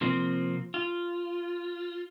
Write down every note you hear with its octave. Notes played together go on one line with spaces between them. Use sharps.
C3 F3 A#3 C4
F4